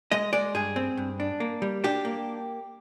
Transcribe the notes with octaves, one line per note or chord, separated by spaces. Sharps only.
G#3 D#5
G#3 D5
G2 G#4
C4
G2
D4
A#3
G3
D4 G4
A#3